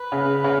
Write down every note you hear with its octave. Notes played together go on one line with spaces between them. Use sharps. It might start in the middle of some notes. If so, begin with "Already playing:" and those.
Already playing: B4
C#3
C#3